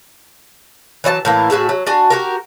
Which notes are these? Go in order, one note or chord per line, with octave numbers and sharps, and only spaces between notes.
E3 F#3 D5 A5
A2 E3 A#3
A2 F#4 G#4 E5
F#3
D4 F#4 G#5
F#4 G4 A#4